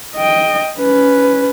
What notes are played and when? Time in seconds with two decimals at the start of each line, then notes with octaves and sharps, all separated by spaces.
0.16 D#5 G5
0.78 C#4 B4